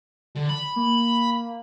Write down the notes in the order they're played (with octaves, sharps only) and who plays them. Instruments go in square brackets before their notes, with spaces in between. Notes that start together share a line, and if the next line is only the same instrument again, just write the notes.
[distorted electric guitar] D3
B5
[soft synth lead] A#3